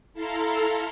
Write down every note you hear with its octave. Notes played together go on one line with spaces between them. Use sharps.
E4 A4 F5 A#5 C6